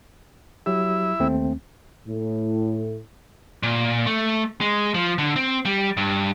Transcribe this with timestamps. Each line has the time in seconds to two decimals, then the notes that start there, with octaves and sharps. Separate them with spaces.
0.66 F#3 E4 G4 E5
1.20 D#2 A3 C4
2.07 A2
3.63 A#2
4.07 A3
4.61 G#3
4.94 F3
5.18 D3
5.36 C4
5.65 G3
5.97 G2